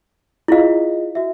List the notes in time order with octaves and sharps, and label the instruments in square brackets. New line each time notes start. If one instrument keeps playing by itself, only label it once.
[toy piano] E4 F5 [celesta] F4 G#4 D#5
[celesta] F#4 E5